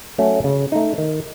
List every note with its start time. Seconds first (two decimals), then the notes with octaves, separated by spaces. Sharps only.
0.18 F#3 A3 C#4
0.44 C#3
0.72 A3 D#4
0.98 D#3